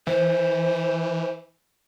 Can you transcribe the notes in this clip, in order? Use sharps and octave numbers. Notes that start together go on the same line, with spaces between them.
E3 C5